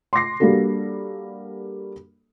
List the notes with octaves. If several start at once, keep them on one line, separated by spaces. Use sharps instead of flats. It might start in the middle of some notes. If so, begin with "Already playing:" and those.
C6 D6 A#6 C7
G3 A#3 D4 F#4 A4